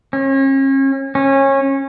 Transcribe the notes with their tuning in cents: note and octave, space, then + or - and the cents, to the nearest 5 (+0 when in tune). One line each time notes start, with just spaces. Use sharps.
C#4 -40
C#4 -25